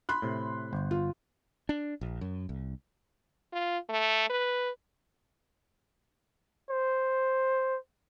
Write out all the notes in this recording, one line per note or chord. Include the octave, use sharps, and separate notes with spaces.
B5 C6 F#6
A2 C3
G1 C5
F4
D4
A#1
F#2
C2
F4
A3
B4
C5